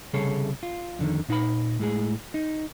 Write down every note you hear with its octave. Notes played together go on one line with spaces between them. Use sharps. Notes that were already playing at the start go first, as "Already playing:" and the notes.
C2 C#3 G3 G#4 A4 C#5
F4
F2 D3 D#3
A#2 D#4 B4 B5
A2 G#3 G#4
D#4